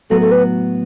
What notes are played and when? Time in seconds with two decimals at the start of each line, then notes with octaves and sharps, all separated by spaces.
0.10 A2 F#3 B3 F#4 A4
0.21 A4
0.32 B4